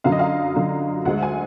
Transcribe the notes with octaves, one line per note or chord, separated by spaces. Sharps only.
F#2 D3 F#3 F5
D#5
F5
F#2 D3 F#3
D2 D3 G#3 F#5
G#5